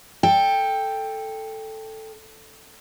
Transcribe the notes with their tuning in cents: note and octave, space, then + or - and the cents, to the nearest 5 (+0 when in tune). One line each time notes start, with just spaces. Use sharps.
A4 +0 G5 +10